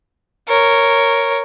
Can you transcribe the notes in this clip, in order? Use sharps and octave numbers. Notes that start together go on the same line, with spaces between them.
A#4 C#5